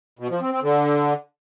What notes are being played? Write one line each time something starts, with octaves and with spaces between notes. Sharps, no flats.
B2
F3
C4
C4
D3